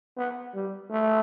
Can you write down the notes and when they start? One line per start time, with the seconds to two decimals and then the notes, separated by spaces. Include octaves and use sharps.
0.17 B3
0.54 G3
0.91 A3